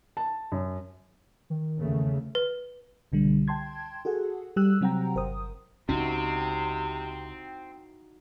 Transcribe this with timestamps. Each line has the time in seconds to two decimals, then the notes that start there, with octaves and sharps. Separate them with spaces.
0.17 A5
0.52 F#2
1.50 D#3
1.80 E2 C#3 A3
2.35 B4
3.12 C2 B2 D3 G3
3.48 G5 A5 C6 G#6
4.05 F#4 G#4 A4 F#5
4.56 G3 G4 E6 F#6
4.81 C3 F#3 C4 F#5 G5 A#5
5.15 G1 A#4 C5 D#6
5.89 C#2 C3 C4 C#4 D#4 E4 F#4